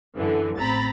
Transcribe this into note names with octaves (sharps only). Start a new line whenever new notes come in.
F#2 D3 E3
A1 C4 A#5 B5 A6